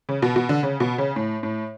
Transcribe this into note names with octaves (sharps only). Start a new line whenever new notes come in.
C#3
B2
B2
D3
C#3
B2
C#3
A2
A2